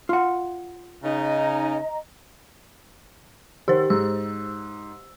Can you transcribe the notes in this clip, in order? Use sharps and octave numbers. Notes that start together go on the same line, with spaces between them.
F4 F#5
C#3 D#4 D#5 A#5
D#3 G4 C5 C6
G#2 E6